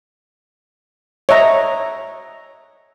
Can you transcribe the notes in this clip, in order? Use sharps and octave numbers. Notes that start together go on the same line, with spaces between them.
C#5 D#5 E5 A#5